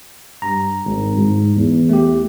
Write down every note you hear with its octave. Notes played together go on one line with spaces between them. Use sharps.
G2 A#5
G#1
G#2
E2
A3 G4